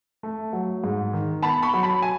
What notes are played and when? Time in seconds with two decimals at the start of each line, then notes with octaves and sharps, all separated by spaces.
0.23 A3
0.53 F#3
0.84 G#2
1.13 D#3
1.43 B3 A5 B5
1.63 B5 C#6
1.74 F#3
1.83 A5 B5
2.02 G#5